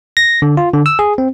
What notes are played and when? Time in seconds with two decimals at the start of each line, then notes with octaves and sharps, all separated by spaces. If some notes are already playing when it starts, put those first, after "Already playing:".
0.17 A#6
0.42 D3
0.57 F4
0.74 D3
0.86 E6
0.99 G#4
1.18 C4